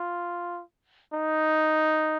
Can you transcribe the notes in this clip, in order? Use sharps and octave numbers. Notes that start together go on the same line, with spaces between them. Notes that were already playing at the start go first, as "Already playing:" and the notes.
Already playing: F4
D#4